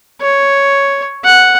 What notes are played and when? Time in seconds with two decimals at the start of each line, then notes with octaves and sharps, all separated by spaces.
0.21 C#5
1.25 F#5